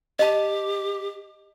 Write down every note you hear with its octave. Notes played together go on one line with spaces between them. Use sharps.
G4 D#5 A5